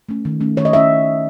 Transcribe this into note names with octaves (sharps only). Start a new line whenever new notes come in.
A3 C#4
D#3
A3 C#4
D#3 C#5
D#5
A3 C#4 E5